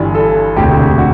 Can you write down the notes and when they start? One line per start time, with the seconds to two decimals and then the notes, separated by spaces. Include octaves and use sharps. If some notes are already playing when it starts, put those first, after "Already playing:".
Already playing: G1 G2 E3 G3
0.15 A4
0.56 E1 D2 C3 G4
0.98 F#4